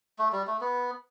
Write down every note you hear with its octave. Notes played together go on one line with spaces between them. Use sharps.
A3
G3
A3
B3